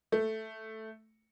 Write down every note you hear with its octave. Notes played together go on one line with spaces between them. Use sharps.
A3